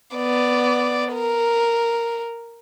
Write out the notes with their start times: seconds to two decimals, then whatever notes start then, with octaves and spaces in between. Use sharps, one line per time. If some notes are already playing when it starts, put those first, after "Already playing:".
0.15 B3 D5
1.13 A#4